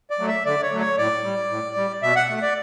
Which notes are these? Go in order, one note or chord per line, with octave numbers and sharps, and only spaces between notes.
D5
F#3 A3
E5
D3 D5
C#5
F#3 A3
C#5
A2 D5
G3
A2
G3
B2 E5
F#5
A3
D5